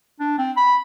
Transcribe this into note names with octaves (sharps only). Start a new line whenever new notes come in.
D4
C4
B5